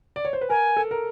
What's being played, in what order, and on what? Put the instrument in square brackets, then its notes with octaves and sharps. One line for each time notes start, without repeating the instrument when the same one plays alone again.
[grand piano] D5
C#5
C5
B4
[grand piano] A#4 [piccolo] G#5
[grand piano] A4
A#4